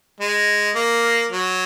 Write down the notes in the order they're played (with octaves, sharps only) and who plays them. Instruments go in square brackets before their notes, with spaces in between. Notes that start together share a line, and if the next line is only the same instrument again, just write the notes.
[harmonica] G#3
A#3
F#3